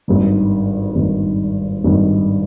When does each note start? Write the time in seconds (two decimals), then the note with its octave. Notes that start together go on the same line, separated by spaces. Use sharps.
0.08 G#1 G2 D#3
0.96 G#1 G2 D#3
1.84 G#1 G2 D#3